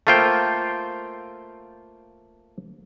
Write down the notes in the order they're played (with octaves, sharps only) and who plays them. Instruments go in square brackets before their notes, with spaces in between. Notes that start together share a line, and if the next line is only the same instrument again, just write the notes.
[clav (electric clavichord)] A3 A#3 F4 C5 G5